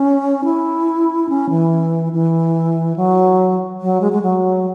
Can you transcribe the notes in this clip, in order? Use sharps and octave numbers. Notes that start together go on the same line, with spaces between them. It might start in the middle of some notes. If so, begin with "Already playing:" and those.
Already playing: C#4
E4
C#4
E3
E3
F#3
F#3
G#3
G#3
F#3